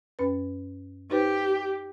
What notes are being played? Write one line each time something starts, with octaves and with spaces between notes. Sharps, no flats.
F#2 C#4 B4
D#4 G4 B4 C5